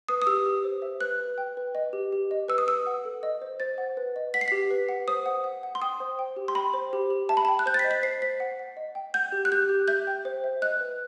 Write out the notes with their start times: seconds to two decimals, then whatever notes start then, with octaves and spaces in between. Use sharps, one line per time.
0.09 B4 D#6
0.22 D#6
0.27 G4 E6
0.46 G4
0.64 C5
0.82 E5
1.01 B4 F#6
1.20 B4
1.38 G5
1.57 B4
1.75 D#5
1.93 G4
2.12 G4
2.31 D#5
2.48 B4 E6
2.58 D#6
2.67 B4 E6
2.86 F#5
3.05 A4
3.23 D#5
3.42 C5
3.60 C5 A6
3.78 F#5
3.97 B4
4.16 D#5
4.34 F#5 B6
4.41 C7
4.48 G4 B6
4.71 B4
4.89 F#5
5.08 C5 D#6
5.26 F#5
5.44 F#5
5.63 F#5
5.75 C6
5.82 G5 D#6
6.00 C5
6.19 G5
6.36 G4
6.48 C6
6.55 G5 B5
6.74 C5
6.93 G4
7.10 G4
7.29 E5 A5
7.37 B5
7.45 A5
7.48 G5
7.59 F#6
7.66 C5 G6
7.74 A6
7.79 B6
7.84 D#5
7.91 B6
8.03 C5 C7
8.22 C5 B6
8.40 F#5
8.59 F#5
8.77 D#5
8.95 G5
9.14 F#5 G6
9.32 G4
9.45 F#6
9.52 G4 G6
9.69 G4
9.88 E5 G6
10.07 G5
10.25 C5
10.44 E5
10.62 D#5 F#6
10.80 B4